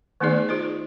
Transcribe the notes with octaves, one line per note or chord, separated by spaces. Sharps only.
D#3 A3 B3 D#4 G#4 D5
D#4 F4 G#4 C5 D#5